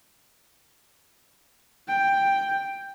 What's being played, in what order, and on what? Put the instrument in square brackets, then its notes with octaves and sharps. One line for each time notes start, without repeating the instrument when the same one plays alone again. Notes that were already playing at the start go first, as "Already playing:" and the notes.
[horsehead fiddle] G5